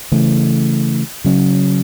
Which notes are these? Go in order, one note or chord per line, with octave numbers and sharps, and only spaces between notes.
C#3 E3 A3
C#3 F#3 C#4